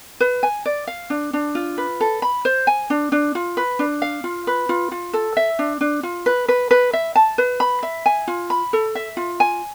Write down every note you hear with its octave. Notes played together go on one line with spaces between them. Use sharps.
B4
G#5
D5
F5
D4
D4
F4
B4
A4
B5
C5
G#5
D4
D4
F4
B4
D4
F5
F4
B4
F4
F4
A4
E5
D4
D4
F4
B4
B4
B4
E5
A5
B4
B5
E5
G#5
F4
B5
A4
E5
F4
G#5